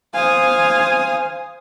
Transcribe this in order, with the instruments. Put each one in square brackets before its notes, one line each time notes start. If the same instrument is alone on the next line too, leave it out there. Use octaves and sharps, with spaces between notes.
[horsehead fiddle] C5 G#5 [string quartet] F5 D#6